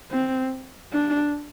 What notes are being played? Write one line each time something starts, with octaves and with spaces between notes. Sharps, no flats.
C4
D4